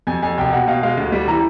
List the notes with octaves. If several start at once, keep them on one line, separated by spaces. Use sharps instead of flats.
F2 G#5
F2 G#5
C2 G5
B2 F#5
B2 F5
G#3 F5
D2
G3
E3 A#5